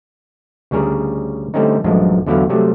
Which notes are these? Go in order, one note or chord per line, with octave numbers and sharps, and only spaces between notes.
D2 C#3 G3 G#4 A#4
D3 G3 A3 C4 C#4 D#4
A1 F#2 F3 G#3 D4
E2 D3 F#3 B3 E4 F5
C3 F#3 G3 A3